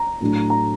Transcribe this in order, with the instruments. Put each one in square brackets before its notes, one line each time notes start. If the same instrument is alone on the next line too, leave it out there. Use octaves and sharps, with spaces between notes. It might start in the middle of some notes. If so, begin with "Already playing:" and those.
Already playing: [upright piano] A#5
A2 F#3 A3 D4
A#5